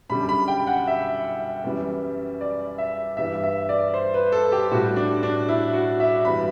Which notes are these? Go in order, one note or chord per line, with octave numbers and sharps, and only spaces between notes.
F#2 D3 G3 B5
B5
G5
F#5
E5
F#2 E3 G3
D5
E5
G2 E3 G3 E5
E5
D5
C5
B4
A4
G4
A2 G3 F#4
D4
D4
E4
F#4
E5
G2 E3 G3 B5